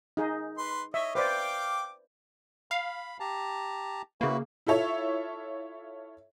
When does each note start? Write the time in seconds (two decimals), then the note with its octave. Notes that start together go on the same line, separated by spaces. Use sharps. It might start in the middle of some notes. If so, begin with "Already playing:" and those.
0.17 D#4 G#4 D#5
0.58 B4 C6
0.94 C#5 D#5 E5
1.15 B4 C5 D5 F5 G5 D6
2.71 F5 B5
3.20 G4 A5 A#5
4.21 C#3 A#3 E4 F#4 B4
4.67 E4 F4 A4 C#5 E5